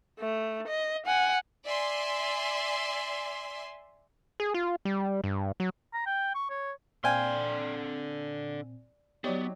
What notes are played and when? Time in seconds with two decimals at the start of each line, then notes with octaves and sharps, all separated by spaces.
0.19 A3
0.68 D#5
1.06 F#5 G#5
1.66 D5 E5 G#5 C6
4.40 G#4
4.54 F4
4.85 G3
5.24 G2
5.60 F#3
5.94 A#5
6.06 G5
6.35 C#6
6.50 C#5
7.04 A#2 D3 C4 D5 F5 G5 G#5 C6
9.24 F#3 B3 D#4 G4 C#5 D5